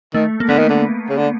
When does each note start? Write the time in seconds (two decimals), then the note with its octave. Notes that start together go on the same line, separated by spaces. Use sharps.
0.14 D#3 A3
0.40 A#3
0.48 D3 B3
0.58 D#3
0.69 D3
1.09 C#3
1.17 D3